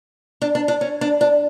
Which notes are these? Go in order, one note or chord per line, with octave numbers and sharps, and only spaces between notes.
D4
D4
D4
C#4
D4
D4